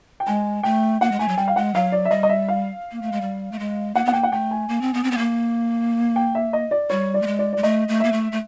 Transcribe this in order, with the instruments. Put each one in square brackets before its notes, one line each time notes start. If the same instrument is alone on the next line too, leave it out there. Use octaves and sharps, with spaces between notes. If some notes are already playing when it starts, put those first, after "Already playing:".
[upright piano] G5
[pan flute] G#3 [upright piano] G#5
[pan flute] A3 [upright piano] G5
[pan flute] A#3 [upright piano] F#5
[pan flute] G#3
[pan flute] A3 [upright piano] G#5
[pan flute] F#3
[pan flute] G3 [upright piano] G5
[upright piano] F5
[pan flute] G#3 [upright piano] F#5
[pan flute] F#3 [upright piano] F5
[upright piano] D5
E5
[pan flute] G3 [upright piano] D#5
[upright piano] D#5
E5
F5
[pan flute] A#3
A3
G#3
G3
A3
G#3
[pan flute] A#3 [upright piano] F#5
[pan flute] B3 [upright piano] F#5
[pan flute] A#3 [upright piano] G5
[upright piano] F#5
[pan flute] A3 [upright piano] G5
[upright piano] G#5
[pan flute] A#3
C4
B3
C4
B3
A#3
[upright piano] G5
E5
D#5
D5
[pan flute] G3 [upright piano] C#5
[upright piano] D5
[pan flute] A3
G#3
[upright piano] D5
[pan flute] G#3 [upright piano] D5
[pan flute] A3 [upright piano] D#5
[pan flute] A3
[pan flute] A#3 [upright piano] E5
[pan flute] A3
A3